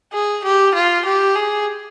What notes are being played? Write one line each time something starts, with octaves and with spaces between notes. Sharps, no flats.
G#4
G4
F4
G4
G#4